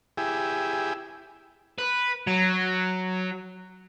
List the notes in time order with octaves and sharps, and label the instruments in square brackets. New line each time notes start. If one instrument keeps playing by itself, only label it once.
[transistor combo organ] E4 G4 G#4
[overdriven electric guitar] B4
F#3